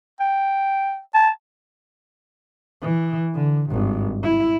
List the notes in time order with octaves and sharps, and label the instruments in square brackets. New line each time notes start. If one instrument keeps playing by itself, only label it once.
[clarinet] G5
A5
[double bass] E3
D3
G#1 G2
E4